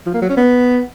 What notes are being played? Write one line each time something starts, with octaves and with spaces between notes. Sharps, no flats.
F3
A#3
F#3
C#4
B3